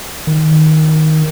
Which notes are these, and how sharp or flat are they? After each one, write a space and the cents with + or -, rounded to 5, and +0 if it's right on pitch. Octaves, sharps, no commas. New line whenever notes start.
D#3 +5